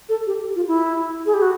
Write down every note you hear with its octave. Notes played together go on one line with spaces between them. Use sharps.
A4
G4
F4
E4
G#4
G4
F#4